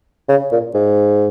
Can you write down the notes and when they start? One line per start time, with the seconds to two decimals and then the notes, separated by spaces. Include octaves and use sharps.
0.29 C#3
0.52 A#2
0.74 G#2